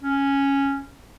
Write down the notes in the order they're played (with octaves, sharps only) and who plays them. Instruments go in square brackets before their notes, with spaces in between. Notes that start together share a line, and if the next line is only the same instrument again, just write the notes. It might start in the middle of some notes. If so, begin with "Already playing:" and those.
[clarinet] C#4